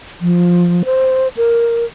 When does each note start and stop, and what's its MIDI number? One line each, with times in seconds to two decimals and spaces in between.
0.21 0.83 53
0.85 1.28 72
1.37 1.85 70